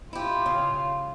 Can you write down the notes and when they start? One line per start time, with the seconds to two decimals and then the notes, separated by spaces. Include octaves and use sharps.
0.13 E4 F4 G4
0.46 C#3